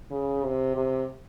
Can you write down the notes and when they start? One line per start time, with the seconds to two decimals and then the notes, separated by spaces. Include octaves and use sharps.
0.11 C#3
0.44 C3
0.76 C3